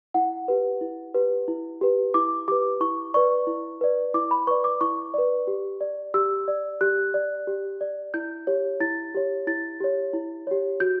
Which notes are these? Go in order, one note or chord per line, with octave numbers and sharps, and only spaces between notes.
E4 F#5
G4 B4
E4
G4 B4
E4
G4 B4
E4 D6
G4 B4 D6
E4 C#6
B4 D5 C#6
E4
B4 D5
E4 D6
B5
B4 D5 C#6
D6
E4 C#6
B4 D5
G4
D5
G4 E6
D5
G4 F#6
D5
G4
D5
E4 G6
G4 C#5
E4 A6
G4 C#5
E4 A6
G4 C#5
E4
G4 C#5
F#4 G6